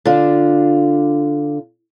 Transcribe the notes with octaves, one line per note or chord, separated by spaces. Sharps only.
D3 D4 F4